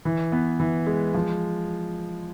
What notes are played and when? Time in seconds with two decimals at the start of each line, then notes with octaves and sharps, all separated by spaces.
0.05 E3
0.32 B3
0.60 E3
0.87 G#3
1.14 F3